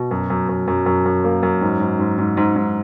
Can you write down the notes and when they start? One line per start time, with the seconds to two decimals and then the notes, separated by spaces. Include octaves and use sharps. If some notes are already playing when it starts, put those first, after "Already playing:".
Already playing: B2
0.11 F#2
0.30 F#2
0.49 F#2
0.67 F#2
0.86 F#2
1.05 F#2
1.24 A#3
1.43 F#2
1.61 G#2
1.80 G#2
1.99 G#2
2.18 G#2
2.37 G#2
2.56 G#2